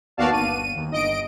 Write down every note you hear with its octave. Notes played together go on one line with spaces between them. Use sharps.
D#2 B3 F#4 D5 F5 A5
G1 D#7
D#2
G1 D#5 D7